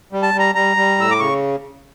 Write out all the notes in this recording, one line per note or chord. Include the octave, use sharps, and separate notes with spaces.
G3
A5
G3 A#5
G3 A#5
G3
A2 E6
D6
C#3 C#6